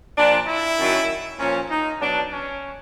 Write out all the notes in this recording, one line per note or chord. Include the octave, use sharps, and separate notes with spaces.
A#2 F3 D4
E4
F#2 D#3 F#3
A#2 F3 C#4
D#4
B2 F#3 D4
C#4